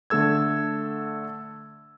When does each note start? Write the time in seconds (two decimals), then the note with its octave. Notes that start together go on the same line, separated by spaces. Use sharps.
0.10 D3 A3 A4 E6 G#6